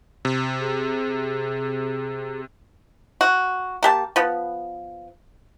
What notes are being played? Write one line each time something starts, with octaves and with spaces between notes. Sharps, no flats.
C3
G#4
F#4
A#3 G4 A5
F3 B3